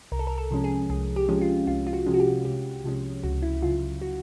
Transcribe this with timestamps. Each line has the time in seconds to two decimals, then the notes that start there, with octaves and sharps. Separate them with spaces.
0.12 C2 A#4
0.19 A4
0.27 A#4
0.38 A4
0.51 C3 F3 G#3 C#4
0.64 G#4
0.90 C2 G#4
1.16 G4
1.28 C3 F3 G#3 C#4
1.41 F4
1.67 C2 F4
1.87 F4
1.93 F#4
2.06 C3 F3 G#3 C#4
2.14 F#4
2.20 G4
2.45 C2 G4
2.84 C3 F3 G#3 C#4
3.23 C#2 F#4
3.42 E4
3.62 C#3 F#3 F4
4.02 F#4